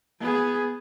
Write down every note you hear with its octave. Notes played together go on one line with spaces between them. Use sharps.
B3 G#4